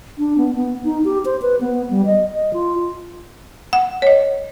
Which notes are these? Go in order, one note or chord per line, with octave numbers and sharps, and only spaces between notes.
D4
B3
B3
D#4
G4
C5
B4
B3
G3
D#5
D#5
F4
F#5
C#5 D#5